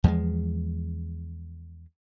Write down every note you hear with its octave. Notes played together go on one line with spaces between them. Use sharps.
E2 F3 G3 G#3